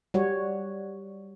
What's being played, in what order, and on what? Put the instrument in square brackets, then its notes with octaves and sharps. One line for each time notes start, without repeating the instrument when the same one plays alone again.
[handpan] G3 F#4 C#5